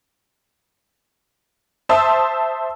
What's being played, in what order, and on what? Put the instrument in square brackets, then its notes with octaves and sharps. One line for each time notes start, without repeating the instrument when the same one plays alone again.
[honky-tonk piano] C5 E5 A5 C6 D#6 E6